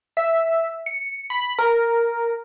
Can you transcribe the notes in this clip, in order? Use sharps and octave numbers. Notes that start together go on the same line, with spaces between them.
E5
C#7
B5
A#4